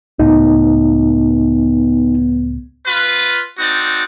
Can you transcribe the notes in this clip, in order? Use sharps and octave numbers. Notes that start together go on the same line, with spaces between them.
C#2 A2 B3 D#4
F4 B4
C4 D#4 F#4 D5